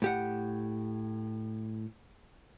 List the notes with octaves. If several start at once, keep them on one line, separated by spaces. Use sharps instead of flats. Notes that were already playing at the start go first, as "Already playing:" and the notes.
A2 G4 F#5